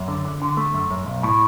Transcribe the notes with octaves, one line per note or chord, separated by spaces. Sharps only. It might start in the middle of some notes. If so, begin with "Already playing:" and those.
Already playing: F#2
D3
D3
D3
A3
F#2
F#2
B1
A2